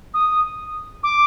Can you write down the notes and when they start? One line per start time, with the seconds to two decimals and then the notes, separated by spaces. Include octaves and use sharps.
0.14 D#6
1.03 D6